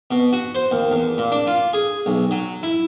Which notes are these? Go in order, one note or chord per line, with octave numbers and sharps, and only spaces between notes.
B2
F#4
C5
D#2
E2
A#2
D4
F4
G#4
B1
F#3
E4